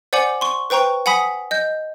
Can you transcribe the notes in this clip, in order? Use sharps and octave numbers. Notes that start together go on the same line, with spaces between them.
C5 D5 F#5 G#5 D6 F#7
C6 C#6
B4 C5 G5 A#5 C#6
F#5 G#5 B5 D#6 B6
D#5 G6